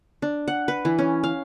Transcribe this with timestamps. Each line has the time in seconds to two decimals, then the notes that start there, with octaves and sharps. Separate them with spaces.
0.22 D4
0.48 F#5
0.68 B4
0.85 E3
0.99 C#4
1.24 F5